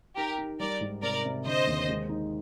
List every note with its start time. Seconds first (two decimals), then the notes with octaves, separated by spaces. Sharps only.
0.16 D#4 G4 A#4
0.38 D#4
0.60 G3 A#4 D5
0.81 G#2
1.02 C3 A#4 D5
1.25 C3
1.46 D3 C5 D#5
1.67 D#2
1.88 G#3
2.09 D#4